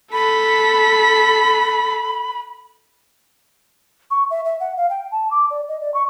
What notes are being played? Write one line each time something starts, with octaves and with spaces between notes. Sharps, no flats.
A4 B5 B6
C#6
E5
E5
F#5
F5
G5
A5
D6
D5
D#5
D5
C#6